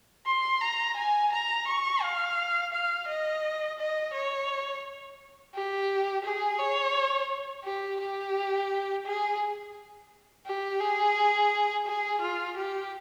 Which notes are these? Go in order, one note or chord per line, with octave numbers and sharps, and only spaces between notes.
C6
A#5
G#5
A#5
C#6
F5
F5
D#5
D#5
C#5
G4
G#4
C#5
G4
G4
G#4
G4
G#4
G#4
F4
G4